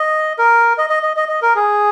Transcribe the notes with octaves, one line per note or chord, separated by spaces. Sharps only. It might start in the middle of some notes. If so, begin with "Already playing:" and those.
Already playing: D#5
A#4
D#5
D#5
D#5
D#5
D#5
A#4
G#4